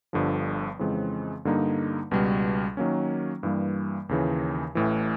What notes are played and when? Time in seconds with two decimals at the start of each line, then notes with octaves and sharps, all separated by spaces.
0.13 G1 G2 D3 F3
0.79 F2 C#3 E3 G#3 C4
1.45 G2 D3 G3 A#3 D#4
2.11 C#2 B2 G3
2.77 D#3 F#3 A#3 C#4
3.43 G2 E3 G3 A#3
4.09 D#2 C#3 E3
4.75 A1 A2 E3